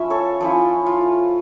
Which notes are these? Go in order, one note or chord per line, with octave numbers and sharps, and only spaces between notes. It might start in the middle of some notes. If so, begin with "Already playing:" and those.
Already playing: F3 C#4 E4 E5
A4 C#5
F3 C#4 E4
F4